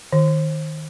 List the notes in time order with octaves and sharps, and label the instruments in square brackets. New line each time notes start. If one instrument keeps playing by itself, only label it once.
[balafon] D#3